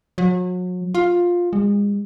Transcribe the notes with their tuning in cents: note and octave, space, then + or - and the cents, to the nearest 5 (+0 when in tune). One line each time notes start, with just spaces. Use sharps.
F#3 -35
F4 +10
G#3 -35